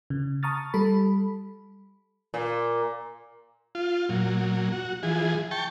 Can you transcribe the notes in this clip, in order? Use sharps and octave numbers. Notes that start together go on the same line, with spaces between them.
C#3
A5 A#5 C#6 D#6 F6 A6
G3 A4 B5
A#2
F4
A#2 F#3
F#4
E3 F3 G#4
G5 A5 C#6